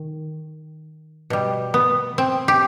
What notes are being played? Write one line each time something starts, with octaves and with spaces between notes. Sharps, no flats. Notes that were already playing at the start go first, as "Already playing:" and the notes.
Already playing: D#3
B2 G3
B3
C4
G4